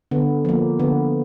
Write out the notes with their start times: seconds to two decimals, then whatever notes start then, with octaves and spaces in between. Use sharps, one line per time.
0.11 D3 B3
0.45 F3 A#3
0.79 D3 B3